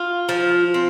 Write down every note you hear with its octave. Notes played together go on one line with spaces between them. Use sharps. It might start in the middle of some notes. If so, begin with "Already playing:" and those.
Already playing: F4
F3
C4